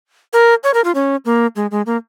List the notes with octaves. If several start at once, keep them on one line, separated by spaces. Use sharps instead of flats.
A#4
C#5
A#4
F4
C#4
A#3
G#3
G#3
A#3